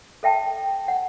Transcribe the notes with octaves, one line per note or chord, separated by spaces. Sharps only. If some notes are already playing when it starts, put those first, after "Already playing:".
A4 E5 G5 A5
F#5